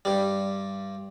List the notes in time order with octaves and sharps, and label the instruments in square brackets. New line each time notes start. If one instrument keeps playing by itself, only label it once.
[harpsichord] G2 G3